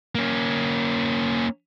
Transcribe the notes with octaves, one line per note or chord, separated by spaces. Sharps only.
A#3 C#4